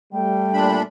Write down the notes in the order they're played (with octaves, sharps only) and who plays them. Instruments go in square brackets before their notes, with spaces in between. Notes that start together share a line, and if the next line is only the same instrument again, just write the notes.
[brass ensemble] G3 A3 [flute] G5
[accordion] A#2 D4 B5